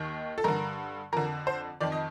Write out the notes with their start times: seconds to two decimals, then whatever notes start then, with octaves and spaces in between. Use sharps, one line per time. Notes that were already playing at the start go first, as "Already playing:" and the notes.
Already playing: D#2 D#3
0.38 A4
0.44 G2 D3 A#4
1.12 F2 D3 A#4
1.47 C5
1.80 F2 D#3 D5
1.92 D#5